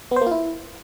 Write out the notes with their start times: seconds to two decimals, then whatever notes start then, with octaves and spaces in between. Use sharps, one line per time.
0.11 B3
0.16 C5
0.21 A#3
0.26 F4
0.31 E4